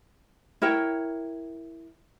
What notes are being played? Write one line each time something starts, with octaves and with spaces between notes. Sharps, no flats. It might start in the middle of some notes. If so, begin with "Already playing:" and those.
E4 A#4 C#5 G5